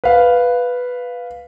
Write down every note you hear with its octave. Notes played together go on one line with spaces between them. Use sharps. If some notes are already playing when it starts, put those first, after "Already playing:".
B4 F5